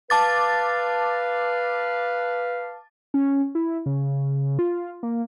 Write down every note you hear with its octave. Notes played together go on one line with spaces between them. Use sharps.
B4 F5 A5 D6 A6
C#4
E4
C#3
F4
A#3